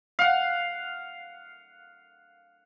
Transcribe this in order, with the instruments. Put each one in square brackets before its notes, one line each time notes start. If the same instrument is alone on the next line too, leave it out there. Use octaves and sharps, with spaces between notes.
[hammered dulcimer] F5 F#5